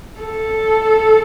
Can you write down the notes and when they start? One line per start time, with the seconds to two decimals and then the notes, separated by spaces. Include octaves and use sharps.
0.20 A4